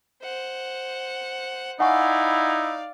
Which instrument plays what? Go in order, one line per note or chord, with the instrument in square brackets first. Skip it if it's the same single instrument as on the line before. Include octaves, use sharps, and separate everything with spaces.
[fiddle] C5 F#5
[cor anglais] D#4 [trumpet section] E4 [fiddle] D5 F5 [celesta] F#5 G#5 C#6